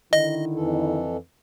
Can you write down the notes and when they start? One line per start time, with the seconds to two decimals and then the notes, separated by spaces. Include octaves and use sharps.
0.13 D3 D#3 E4 D#5
0.54 F2 E3 A4